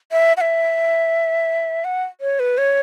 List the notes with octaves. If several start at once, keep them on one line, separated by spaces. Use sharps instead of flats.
E5
F#5
E5
F#5
C#5
B4
C#5